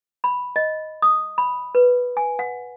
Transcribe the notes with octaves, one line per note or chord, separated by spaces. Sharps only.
B5
D#5
D#6
B5
B4
G#5
F#5